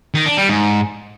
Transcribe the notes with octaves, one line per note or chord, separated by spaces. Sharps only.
D#3
D4
G3
G#2